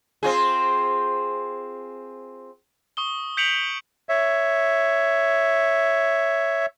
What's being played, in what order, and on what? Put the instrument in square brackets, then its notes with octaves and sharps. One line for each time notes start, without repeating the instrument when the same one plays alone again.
[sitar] C4 F4 G#4
[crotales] C#6 D#6 G7
G6 B6 C#7 D7 F7 F#7
[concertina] C#5 E5